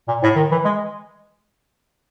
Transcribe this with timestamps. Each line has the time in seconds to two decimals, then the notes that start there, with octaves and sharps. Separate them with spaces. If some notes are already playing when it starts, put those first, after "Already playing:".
0.08 A#2
0.23 A2
0.36 D#3
0.51 E3
0.65 G#3